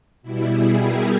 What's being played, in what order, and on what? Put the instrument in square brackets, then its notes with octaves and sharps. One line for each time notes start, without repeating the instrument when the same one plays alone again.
[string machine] B2 G3 E4
E4 G#4
G4 A#4